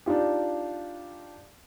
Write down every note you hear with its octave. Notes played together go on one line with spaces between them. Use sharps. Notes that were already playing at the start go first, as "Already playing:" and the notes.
D4 D#4 F4 G4